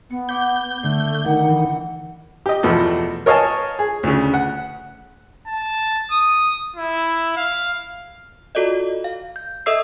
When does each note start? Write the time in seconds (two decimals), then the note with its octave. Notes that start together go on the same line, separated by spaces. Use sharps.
0.10 B3 C#7
0.29 F#5 D6 G6 B6
0.83 D3 A3 C7
1.26 D#3 F#5
1.49 E3
2.46 G4 D#5
2.63 E2 B2 F3 A3
3.26 A#4 C#5 D#5 F5 G#5 A5
3.79 G#4
4.03 D2 C#3
4.34 F#5
5.48 A5
6.11 D#6
6.76 E4
7.37 F5
8.55 F4 F#4 A4 D5 D#5
9.04 F5
9.36 G6
9.66 A4 D#5 E5 D#6 E6 C7